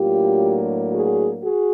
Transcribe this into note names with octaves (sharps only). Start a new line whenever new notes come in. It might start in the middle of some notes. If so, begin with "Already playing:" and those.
Already playing: A2 F#3 A#3 D4 F4 G4
F#4 G#4
F#4 G#4